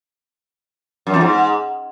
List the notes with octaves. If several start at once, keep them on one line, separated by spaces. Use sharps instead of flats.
F#2
E2
G#2